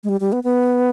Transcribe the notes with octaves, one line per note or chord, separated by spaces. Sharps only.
G#3
G3
G3
B3
B3